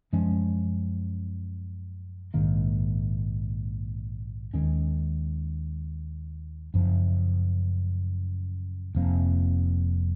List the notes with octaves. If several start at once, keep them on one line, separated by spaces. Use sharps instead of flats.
F#2 F3 G#3 C#4
A#1 G#2 D#3 A#3
D#2 D#3 G#3 C#4
F#1 F#2 F3
F1 F2 F3 A#3